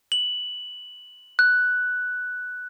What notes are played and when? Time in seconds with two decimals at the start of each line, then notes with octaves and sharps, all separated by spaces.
0.12 F#7
1.39 F#6